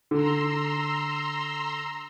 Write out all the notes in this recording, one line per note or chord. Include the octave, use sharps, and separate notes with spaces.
D3 A#5 C6 E6